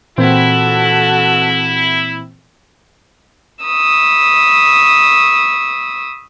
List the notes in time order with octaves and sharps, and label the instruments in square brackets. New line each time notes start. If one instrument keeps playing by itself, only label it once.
[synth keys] A#2 E3 C4 [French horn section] E4 [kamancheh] F#4 A4
[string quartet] B5 C#6 D#6 E6